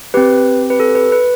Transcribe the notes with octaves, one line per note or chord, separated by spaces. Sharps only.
C4 G4 B4
B4
A4
B4
B4